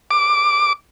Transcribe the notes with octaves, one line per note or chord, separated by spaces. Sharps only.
D6